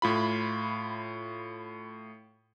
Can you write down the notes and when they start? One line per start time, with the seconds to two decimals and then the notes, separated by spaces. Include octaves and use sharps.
0.02 A2 F4 B5